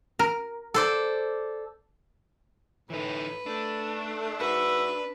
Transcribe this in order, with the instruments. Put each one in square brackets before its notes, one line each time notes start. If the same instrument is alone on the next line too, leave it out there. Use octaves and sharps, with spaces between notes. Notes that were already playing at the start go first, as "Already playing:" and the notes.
[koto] A#4
[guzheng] A4 C5 D5
[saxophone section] A2 [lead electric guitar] E3 D#4 [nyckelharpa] B4
[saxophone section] A3 [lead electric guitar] D4
[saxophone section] G#2 F#4 E5 [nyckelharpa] B4